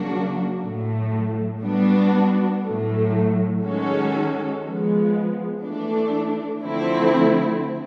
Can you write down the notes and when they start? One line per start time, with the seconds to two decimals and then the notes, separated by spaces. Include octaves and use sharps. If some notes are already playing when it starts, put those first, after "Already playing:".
Already playing: C#3 F#3 A#3 D4 F#4
0.61 A2 F#3 A3
1.62 G3 B3 D4 F#4
2.62 A2 F#3 A3
3.62 D#3 G#3 C#4 F#4 A4
4.63 F3 G#3 B3
5.63 E3 A3 D4
6.63 D3 F3 A3 C4 E4